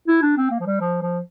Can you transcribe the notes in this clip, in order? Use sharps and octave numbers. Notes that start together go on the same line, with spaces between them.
E4
D4
C4
A#3
F3
G3
F3
F3